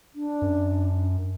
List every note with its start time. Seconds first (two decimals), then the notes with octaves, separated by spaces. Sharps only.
0.15 D4
0.42 F#2